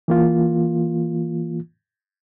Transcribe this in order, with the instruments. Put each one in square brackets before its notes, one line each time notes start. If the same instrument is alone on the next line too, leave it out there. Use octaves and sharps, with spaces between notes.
[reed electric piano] E3 A#3 F4